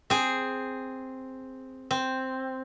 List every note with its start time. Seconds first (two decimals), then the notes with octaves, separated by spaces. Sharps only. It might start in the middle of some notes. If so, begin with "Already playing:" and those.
0.10 C4 G#4
1.91 C4